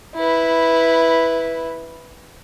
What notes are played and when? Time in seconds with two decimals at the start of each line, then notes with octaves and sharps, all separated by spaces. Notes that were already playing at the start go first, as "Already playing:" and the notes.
0.16 E4 B4